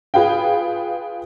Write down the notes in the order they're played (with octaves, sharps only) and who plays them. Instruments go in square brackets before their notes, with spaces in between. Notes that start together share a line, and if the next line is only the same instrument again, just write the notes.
[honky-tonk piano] F4 G#4 B4 F5 G5